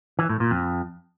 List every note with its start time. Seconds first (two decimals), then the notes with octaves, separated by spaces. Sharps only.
0.19 E3
0.29 A2
0.40 A#2
0.51 F2